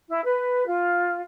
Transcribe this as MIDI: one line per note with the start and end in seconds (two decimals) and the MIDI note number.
0.10 0.22 64
0.24 0.65 71
0.66 1.20 65